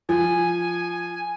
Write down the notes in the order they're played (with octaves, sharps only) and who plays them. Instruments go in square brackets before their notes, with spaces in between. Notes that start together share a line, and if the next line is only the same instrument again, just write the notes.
[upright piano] F3 [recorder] G#5